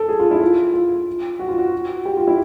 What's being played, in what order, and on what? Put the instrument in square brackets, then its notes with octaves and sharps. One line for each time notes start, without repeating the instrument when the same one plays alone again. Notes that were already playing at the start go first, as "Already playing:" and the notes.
Already playing: [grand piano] A4
G#4
F4
E4
F4
F4
F#4
F4
F#4
G4
F4
E4